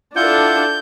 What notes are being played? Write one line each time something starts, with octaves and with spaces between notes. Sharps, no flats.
D4 E4 F4 A4 F#5 G6